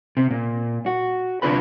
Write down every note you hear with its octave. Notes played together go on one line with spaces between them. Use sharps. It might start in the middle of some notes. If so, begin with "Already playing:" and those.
C3
A#2
F#4
C3 D4 F4 B4 B5